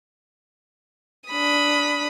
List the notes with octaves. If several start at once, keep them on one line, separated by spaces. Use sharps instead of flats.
D4 B5 D#6